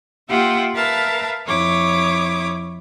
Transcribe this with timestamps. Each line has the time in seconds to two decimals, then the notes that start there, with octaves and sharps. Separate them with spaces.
0.29 A#3 F4 G4 E5 F#5 G5
0.75 A#4 B4 E5 F5 A5 A#5
1.48 F2 E4 C#5 D6 D#6